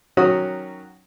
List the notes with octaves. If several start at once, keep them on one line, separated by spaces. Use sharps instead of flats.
D#3 F#3 C#4 F#4 D#6